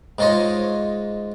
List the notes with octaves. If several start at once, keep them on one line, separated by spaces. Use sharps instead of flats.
G#2 G#3 F4 C5 C#5 D#5